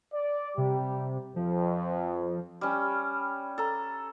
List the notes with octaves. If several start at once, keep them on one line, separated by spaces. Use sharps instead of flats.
D5
C3 G3 G4
F2 F3
G3 C#4
A4 A#5